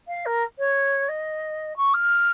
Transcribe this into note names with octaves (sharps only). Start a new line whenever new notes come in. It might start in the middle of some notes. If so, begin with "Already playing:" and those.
F5
A#4
C#5
D#5
C#6
F6